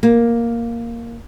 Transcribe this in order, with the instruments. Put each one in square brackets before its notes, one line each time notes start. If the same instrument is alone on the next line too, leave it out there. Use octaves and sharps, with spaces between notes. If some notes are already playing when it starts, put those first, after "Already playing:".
[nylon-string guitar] A#3